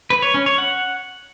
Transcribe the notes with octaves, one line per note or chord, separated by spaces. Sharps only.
B4
C#5
C#4
C#5
F#5